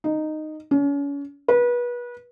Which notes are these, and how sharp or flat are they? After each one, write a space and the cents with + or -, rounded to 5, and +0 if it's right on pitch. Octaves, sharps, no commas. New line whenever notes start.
D#4 -10
C#4 +35
B4 -30